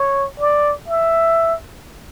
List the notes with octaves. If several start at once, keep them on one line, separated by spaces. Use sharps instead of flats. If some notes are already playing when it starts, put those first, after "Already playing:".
Already playing: C#5
D5
E5